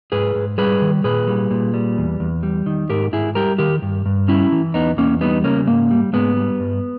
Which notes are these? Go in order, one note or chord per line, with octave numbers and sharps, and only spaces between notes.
G#2 G#4 B4
G#2
G3 G#4 B4
D#3
A#2 G#4 B4
G3
A#2
G3
E2
E2
G3
D#3
G#2 G4 A#4
G#2 E4 G#4
G3 G4 A#4
D#3 G4 A#4
G2
G2
G3 C#4 E4
E3
E2 B3 D#4
E2 A#3 C#4
G3 B3 D#4
C#3 A#3 C#4
G#2 A#3
G3
G#2 G#3 B3
G3
G2